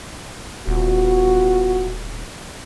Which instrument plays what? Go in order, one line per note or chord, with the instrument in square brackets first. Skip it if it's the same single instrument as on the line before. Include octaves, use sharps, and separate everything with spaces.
[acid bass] D#1 [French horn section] B3 F4 F#4